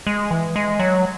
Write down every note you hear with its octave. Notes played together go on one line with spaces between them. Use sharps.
G#3
E3
G#3
F#3